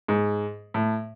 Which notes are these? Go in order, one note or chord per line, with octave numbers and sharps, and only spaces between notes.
G#2
A2